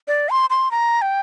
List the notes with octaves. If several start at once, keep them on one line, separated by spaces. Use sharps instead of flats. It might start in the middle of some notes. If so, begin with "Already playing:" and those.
D5
C6
C6
A#5
G5